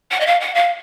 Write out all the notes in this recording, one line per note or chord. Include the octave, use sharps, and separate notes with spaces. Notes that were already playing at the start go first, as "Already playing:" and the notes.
F#5
D#5
F5
F#5
F5